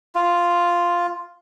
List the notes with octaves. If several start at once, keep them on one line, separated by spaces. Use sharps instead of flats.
F4